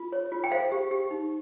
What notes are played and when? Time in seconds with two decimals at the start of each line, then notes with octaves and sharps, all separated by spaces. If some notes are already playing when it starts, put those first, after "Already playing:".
Already playing: F4
0.12 C#5
0.32 F4
0.44 G5
0.51 C5 F5
0.72 G4
0.91 G4
1.11 D#4